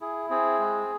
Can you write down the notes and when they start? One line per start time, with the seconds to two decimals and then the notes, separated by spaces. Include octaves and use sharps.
0.01 E4 G#4
0.30 C4 G#4
0.59 G#3